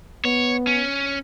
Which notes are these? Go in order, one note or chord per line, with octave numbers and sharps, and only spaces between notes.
B3 C#5
C#4